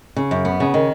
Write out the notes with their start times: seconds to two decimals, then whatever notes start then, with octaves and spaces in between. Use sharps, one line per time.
0.16 C#3
0.31 F#2
0.45 B3
0.60 C#3
0.74 D#3